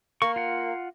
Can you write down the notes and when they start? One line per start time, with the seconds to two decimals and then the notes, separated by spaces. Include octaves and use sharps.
0.22 A#3 C#6
0.36 F4 F#5